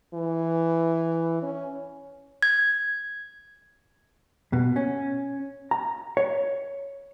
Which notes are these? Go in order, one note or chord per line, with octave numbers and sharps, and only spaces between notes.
E3
C#4
G#6
B2
C#4
A#5
C#5